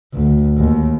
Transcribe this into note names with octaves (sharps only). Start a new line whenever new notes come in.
D2
D#2